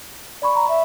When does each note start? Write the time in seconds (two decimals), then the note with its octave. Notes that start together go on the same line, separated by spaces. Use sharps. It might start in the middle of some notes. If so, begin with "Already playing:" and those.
0.42 D5 B5 C#6
0.55 A#5
0.68 E5